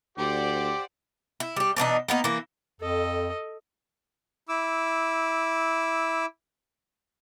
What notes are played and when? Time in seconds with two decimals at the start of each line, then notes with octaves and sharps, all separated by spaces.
0.18 D2 G4 C5 D5 F#5
1.40 E4
1.56 G3 G4
1.76 B2 E3 D4 D#4
2.08 A#3 B3 D#4
2.24 E3 A#3
2.81 F2 A4 D#5
4.49 E4 D6 E6